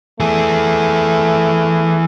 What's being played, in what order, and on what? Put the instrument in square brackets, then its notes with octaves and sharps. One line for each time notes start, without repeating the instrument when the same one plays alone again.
[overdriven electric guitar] E3 G#4 [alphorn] A3